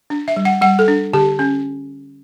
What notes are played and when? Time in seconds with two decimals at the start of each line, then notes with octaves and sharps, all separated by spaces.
0.10 D4
0.28 E5
0.36 G3
0.45 F#5
0.62 G3 F#5
0.79 A4
0.88 D4
1.13 D3 G4
1.39 C#4